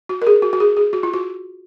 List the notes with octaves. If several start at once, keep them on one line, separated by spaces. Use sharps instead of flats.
F#4
A#4
G#4
F#4
F#4
G#4
G#4
F#4
F4
F#4